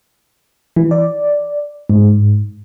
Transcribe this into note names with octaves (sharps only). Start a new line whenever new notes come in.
E3
D5
G#2